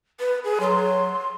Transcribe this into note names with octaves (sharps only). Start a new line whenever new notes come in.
B4
G#4
F#3 C6